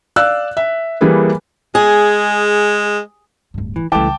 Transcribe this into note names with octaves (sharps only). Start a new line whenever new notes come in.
D5 F5 E6 F#6
E5
E3 G3 A#3 G#4 B4
G#3 G#4
D1 G2
E3
C#2 E3 G3 A3 G5 A5 D6